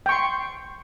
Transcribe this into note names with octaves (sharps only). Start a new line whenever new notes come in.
G5 C6 C#6